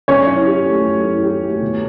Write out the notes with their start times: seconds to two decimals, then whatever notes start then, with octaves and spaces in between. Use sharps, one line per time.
0.08 F#3 C#4 C#5
0.27 E4
0.46 G4
0.65 A3
0.85 F#3
1.04 E4
1.23 G4
1.43 A3
1.61 B2